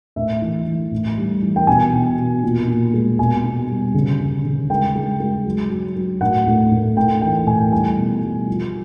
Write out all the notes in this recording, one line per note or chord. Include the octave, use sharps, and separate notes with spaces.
A2 E5
E3
E3
A2
G3
E3
G5
B2 G#5
B2
B2
A#2
A#2
G#3
B2 G#5
B2
G3
C#3
C#3
C#3
G#3 G5
G#3
G#3
F#3
F#3
F#3
A2 F#5
A2
A2
A2 G5
E3 G5
A2 G#5
G3 G#5
B2
G3
F3